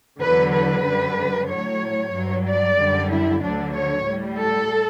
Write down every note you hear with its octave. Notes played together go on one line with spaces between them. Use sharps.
E2 D3 F#3 B4
B4
F#2 D3 G3
A2 F#3 C#5
G2 F#3
D5
F#2 D3 G3
E4
D2 D3 F#3 D4
C#5
A2 G3
A4